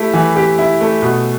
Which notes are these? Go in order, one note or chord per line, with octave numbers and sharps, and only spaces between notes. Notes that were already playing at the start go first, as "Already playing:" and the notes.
Already playing: A3 E4 G4
E3
G4
E4
A3
B2